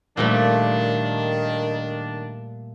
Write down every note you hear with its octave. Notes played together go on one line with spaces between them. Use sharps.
A#2 D#3 G3 A3 D4